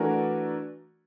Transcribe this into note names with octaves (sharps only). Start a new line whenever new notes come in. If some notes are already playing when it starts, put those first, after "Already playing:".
Already playing: E3 A3 D4 F#4 A#4